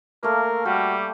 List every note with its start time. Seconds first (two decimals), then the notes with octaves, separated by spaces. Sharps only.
0.23 A3 A#3 A#4 F5
0.65 G3 F#4 G5